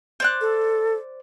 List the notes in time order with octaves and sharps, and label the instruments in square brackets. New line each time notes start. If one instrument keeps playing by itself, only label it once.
[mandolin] C5 D5 F#6
[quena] A4